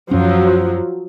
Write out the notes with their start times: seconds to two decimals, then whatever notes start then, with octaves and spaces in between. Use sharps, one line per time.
0.11 F#2 F3 F#3 C#4